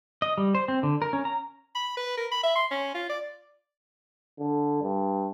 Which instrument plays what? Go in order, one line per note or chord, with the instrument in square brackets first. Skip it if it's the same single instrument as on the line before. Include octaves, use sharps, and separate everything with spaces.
[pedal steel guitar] D#5
G3
C5
C4
D3
A#4
C#4
A#5
[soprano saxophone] B5
B4
A#4
B5
E5
C6
C#4
F4
D5
[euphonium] D3
G2